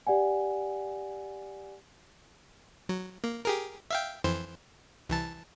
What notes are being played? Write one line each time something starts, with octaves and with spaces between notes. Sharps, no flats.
G4 D5 F#5 G#5
F#3
A#3
G4 G#4 A#4
E5 F5 G5
F2 E3 C5
C2 E3 A5